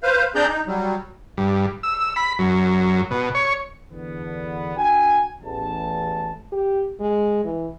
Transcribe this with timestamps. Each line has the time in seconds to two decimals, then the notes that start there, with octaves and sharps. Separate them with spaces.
0.03 B4 C5 F5
0.35 C4 D4 G#4 D5 A#5 G6
0.48 D#4
0.67 F#3 G3
1.37 G2
1.83 E6
2.16 B5
2.39 F#2
3.11 B2
3.35 C#5
3.90 E2 D3 B3
4.77 D4 F#4 G5 G#5
5.42 A1 E2 A5
6.52 G4
7.00 G#3
7.45 E3